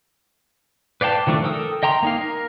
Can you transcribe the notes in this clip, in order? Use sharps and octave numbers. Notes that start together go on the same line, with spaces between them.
B4 D5 F5 G5 A5
D#3 F3 A3 D4
A4 A#4 G5 D#6 E6
D#5 G5 A#5 C6
A#3 D#4 F5
A#4